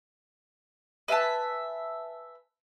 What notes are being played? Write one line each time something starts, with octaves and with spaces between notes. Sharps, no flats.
B4 E5 G#5 A5